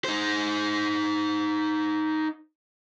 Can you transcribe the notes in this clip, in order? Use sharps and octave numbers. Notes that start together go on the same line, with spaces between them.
D#4 C5